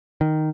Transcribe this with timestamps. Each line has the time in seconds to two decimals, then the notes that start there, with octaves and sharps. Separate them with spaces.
0.21 D#3